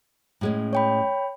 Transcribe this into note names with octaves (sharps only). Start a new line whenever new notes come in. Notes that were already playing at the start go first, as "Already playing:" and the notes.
A2 G#3 C#4
C#5 G5 B5